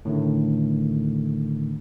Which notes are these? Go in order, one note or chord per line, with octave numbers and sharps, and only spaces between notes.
A2 D3 D#3 A3